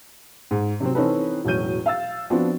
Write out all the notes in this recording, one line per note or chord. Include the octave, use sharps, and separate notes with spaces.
G#2
C3 F#3 C4
E3 C4 C#4 D#4 A4 B4
E1 A2 F#3 C#4 G6 D#7
F5 E6 A6
F3 B3 C4 D4 F#4